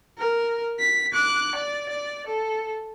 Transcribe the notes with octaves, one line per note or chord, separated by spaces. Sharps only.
A#4
B6
D6 F#6
D5
D5
A4